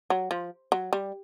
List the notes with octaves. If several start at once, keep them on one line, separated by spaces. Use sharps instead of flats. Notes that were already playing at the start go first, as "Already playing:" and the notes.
F#3
F3
F#3
G3